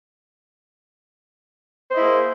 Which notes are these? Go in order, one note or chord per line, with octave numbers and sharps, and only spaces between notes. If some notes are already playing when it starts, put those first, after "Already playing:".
A#3 E4 G#4 C5 D#5